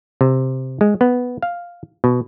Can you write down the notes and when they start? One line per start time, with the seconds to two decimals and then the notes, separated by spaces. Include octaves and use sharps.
0.21 C3
0.81 G#3
1.01 B3
1.43 F5
2.04 B2